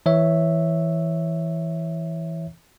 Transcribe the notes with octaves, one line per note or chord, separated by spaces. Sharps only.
E3 C#5 E5